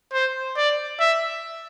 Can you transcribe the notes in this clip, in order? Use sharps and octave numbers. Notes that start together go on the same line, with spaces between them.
C5
D5
E5